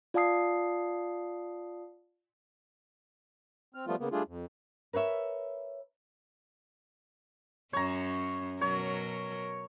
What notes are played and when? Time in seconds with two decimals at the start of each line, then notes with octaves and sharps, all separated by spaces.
0.14 F4 D5 F5 A5 D#6 C7
3.75 C4 F6
3.87 F3 G3 A3 B3 F4
4.00 C#3 A#3 B3
4.12 G3 A3 D4 F4 G#4
4.28 F2
4.93 A#4 B4 C#5 E5
7.73 F#2 C#4 C#5 A#5
8.61 B2 F#3 A#4 C#5